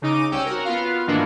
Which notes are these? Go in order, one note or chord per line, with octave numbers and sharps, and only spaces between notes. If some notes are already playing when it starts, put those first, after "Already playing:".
C#3 D#4 D6 D#7
C2 C#4 G5 E6
F#4 A#4
B3 F4 F5
G#2 D#3 E3 A#3 D4 F#4